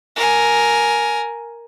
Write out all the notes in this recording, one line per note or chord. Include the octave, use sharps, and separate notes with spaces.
A#4 G#5